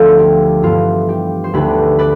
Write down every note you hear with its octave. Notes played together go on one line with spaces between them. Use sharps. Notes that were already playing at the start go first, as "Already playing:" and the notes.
Already playing: D2 D3 F3 A3 B3 D4 F4 A4
G4
G2 E3 B3 D4 F4
G4
C5
D2 D3 A3 D4 G4 B4
B4 D5